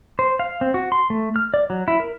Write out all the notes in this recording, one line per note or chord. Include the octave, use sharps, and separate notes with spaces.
C5
F5
C4
F#4
C6
A3
F6
D5
F#3
E4
A#4